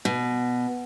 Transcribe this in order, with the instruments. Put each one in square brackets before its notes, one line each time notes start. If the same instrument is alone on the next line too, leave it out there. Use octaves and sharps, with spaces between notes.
[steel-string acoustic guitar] B2